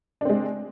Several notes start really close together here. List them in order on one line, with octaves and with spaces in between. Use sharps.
D4 C4 G#3